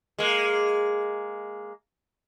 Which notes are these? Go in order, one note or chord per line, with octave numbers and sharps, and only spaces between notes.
G#3 A#3